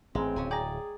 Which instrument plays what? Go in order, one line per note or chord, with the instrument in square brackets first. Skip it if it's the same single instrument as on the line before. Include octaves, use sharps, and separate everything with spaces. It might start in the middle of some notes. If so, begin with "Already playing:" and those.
[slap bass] A1 G#2 [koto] G#3 [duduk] C4
[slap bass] D1 [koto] C#3 G#5
[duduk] G#4 [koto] D5 [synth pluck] G5 G#5 A#5